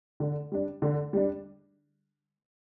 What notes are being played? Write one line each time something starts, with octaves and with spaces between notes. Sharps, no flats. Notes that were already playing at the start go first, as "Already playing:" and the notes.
D3
G3 D4
D3
G3 D4